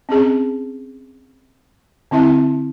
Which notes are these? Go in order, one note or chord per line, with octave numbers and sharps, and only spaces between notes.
C4 C#4 G#4
D3 C4 E4 E5